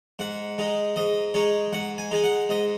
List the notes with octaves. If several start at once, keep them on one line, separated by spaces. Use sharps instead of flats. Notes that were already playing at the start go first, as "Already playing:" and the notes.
G#2 F#5
G#3 D#4
G#2 D#5
G#3 D#4 C#5
G#2 F#5
G#5
G#3 D#4 G#5
F#5
G#2 D#5